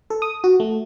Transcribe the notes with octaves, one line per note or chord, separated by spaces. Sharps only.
A4
D#6
F#4
A3